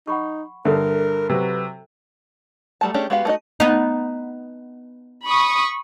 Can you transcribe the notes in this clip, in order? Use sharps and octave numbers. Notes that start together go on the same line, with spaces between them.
D#4 F#5 B5 C#6
G2 D3 A4 A#4 C#5 E5
C3 F#3 F#4 B4
F#3 G3 A3 G4 A5
A3 C#4 D4 G4 G#4
G#3 B3 F#4 G4 F5
A3 C4 D#4 F#4 D#5
B3 D#4
B5 C#6 D#6